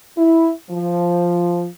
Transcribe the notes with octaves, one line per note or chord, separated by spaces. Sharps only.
E4
F3